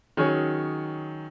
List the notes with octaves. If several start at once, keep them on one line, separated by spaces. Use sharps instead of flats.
D#3 F#3 C#4 G#4 C#5